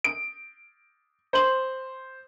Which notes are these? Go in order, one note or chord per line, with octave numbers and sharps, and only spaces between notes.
D7
C5 F#7